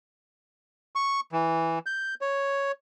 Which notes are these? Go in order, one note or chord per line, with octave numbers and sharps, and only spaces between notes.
C#6
E3
G6
C#5